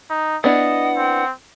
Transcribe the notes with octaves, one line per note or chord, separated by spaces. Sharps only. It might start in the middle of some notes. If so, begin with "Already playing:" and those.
D#4
B3 D4 E4 D#5 F#5
C4